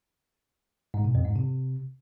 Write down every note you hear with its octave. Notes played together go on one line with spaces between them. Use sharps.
G#2
B2
F2
G#2
C3